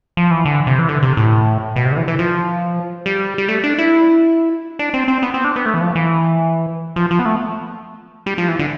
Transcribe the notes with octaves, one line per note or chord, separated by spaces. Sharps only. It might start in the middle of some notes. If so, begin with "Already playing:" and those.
F3
E3
D3
C3
E3
D3
C3
A2
B2
C3
D3
E3
E3
F3
G3
G3
A3
D4
E4
D4
C4
C4
B3
C4
D4
B3
A3
E3
F3
E3
F3
F3
B3
A3
G3
F3
E3
D3